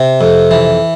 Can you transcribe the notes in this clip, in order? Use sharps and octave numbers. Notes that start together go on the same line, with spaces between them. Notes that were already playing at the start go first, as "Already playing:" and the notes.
Already playing: C3
F2
E3